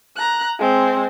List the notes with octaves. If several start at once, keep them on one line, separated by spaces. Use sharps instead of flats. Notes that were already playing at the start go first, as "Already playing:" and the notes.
A#5 F#6
G#3 C4